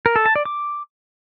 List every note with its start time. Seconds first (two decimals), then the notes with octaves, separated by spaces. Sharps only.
0.06 A#4
0.16 A4
0.26 A5
0.36 D5
0.45 D6